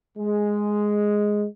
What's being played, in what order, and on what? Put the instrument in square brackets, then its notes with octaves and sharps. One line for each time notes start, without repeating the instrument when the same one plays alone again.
[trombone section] G#3